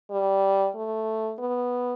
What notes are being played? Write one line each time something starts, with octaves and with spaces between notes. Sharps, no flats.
G3
A3
B3